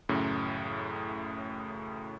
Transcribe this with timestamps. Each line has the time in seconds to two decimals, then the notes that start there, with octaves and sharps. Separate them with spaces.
0.09 A1 F#2 A2 C#3